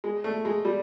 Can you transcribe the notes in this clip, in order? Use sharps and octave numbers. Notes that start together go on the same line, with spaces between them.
G#3
A3
G#3
G3